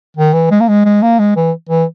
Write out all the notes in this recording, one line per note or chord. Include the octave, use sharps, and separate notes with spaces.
D#3
E3
G#3
A#3
G#3
G#3
A#3
G#3
E3
E3